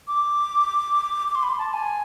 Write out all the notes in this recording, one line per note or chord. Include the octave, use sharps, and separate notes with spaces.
D6
D6
C6
B5
C6
A5
G#5